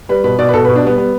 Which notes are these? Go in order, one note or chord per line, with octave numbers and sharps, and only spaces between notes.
G3 B4
B2 B4
B2 D5
B4
B2 A4
B4
B2
D4
G3 B3
G3 B3